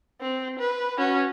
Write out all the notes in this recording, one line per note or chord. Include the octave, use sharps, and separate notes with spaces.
C4
B4
C#4 F#4